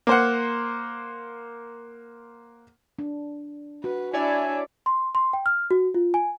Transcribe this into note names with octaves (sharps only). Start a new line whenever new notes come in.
A#3 C5 F#5
D4
F#4 B4
D4 E4 C#5 D5 E5 G#5
C6
C6
G5
F6
F#4
F4
G#5